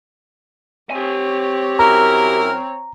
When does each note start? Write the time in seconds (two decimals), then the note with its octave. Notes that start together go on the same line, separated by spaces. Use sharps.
0.91 C4 G4 C#5 G#5
1.79 F#2 E4 A#4 A#5